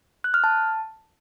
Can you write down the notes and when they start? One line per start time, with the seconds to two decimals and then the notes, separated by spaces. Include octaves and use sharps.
0.24 F#6
0.34 F6
0.44 A5